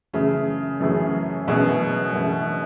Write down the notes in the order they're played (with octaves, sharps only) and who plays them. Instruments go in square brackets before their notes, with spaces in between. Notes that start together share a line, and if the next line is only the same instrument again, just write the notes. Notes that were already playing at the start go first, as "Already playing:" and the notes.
[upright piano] F#2 E3 A3 C#4 G#4 [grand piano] C#3
[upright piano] F#2 E3 A3 C#4 G#4
[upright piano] F#2 E3 A3 C#4 G#4 [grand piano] B2
[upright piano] F#2 E3 A3 C#4 G#4